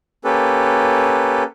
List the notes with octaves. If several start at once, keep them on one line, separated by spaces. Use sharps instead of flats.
A#3 C#4 G4 A4 B4